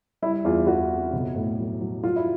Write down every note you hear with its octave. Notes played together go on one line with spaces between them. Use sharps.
G3 E4
E2 F4
E2 F#4
C4
B1
A2
F#3
F#3
F#3 F4
E4